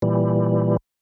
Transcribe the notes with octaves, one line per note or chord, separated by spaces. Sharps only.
A#2 E3 G3